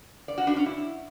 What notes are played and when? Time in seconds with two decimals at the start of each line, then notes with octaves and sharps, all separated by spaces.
0.28 D5
0.38 F#4
0.47 D4
0.56 C#4
0.66 E4